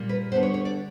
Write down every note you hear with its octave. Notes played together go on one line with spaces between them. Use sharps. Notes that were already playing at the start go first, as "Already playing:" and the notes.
Already playing: A#2 G3 A#3
B4
D3 G3 B3 C5
C#5
C#5
D5